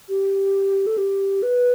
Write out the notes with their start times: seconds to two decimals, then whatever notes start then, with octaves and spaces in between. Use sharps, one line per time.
0.09 G4
0.87 A4
0.98 G4
1.43 B4